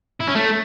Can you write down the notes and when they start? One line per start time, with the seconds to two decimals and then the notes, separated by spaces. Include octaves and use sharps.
0.20 E4
0.28 C#4
0.35 A3